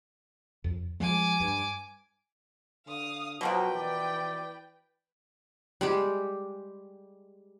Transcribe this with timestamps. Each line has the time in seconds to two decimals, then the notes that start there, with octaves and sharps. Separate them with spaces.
0.64 F2
1.00 F3 G#3 G#5 D6
1.40 G2
2.87 D3 F5 D#6
3.41 B2 F3 F#3 A#3 F#4 B4 G5
3.75 E3 D5
5.81 G3 G#3 G4